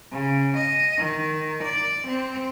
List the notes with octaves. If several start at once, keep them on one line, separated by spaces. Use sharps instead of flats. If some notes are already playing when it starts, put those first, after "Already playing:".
C#3
D#5
D#3
D5
C4